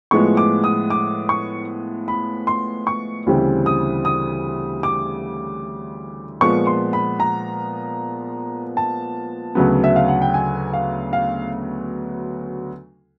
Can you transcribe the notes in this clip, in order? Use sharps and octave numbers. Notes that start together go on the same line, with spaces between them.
A2 F3 G#3 B3 C#6
D6
D#6
D6
C#6
B5
C6
C#6
D2 C#3 E3 G3 C4
D#6
D#6
D6
A#2 F3 G#3 B3 C#6
C6
B5
A#5
A5
D2 C#3 F#3 B3
E5
F5
F#5
G5
G#5
F5
F5